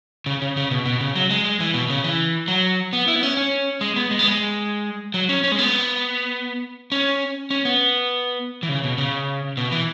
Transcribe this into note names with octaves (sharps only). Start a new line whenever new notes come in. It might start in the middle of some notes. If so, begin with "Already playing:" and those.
C#3
C#3
C#3
B2
B2
C#3
F#3
G#3
G#3
E3
B2
C#3
E3
F#3
B3
E4
B3
C#4
C#4
G#3
B3
G#3
B3
G#3
F#3
C#4
C#4
G#3
B3
C#4
C#4
B3
E3
C#3
B2
C#3
B2
E3